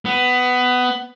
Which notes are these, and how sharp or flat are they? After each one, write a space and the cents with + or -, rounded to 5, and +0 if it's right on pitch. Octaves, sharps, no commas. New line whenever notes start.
B3 +15